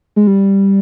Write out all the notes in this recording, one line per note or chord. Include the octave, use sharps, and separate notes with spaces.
G#3
G3